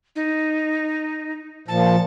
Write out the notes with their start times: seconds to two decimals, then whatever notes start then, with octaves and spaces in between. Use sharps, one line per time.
0.16 D#4
1.68 A#2 F3 A5